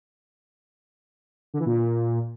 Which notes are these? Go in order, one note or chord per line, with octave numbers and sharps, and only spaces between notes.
D3
E3
A#2